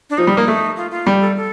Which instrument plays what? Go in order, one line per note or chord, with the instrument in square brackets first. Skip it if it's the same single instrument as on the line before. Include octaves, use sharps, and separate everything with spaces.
[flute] D4
[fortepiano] F3 [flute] D#4
[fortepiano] G3
A#3
A3
[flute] F4
F4
[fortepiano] G3 [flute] G4
[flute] A4
A4